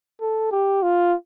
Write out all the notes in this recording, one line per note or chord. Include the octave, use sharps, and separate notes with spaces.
A4
G4
F4